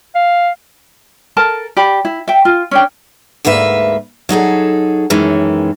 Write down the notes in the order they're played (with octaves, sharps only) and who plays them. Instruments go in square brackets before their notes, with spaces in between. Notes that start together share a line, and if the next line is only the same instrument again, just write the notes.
[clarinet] F5
[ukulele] A4 A#4 A5
G4 D5 B5
E4
E5 G5
F4
C#4 D4 G5
[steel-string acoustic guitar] D2 G#2 A#3 B4 E5
F#3 D#4 G#4 A4
F#2 D#3 E3 G#3 C#4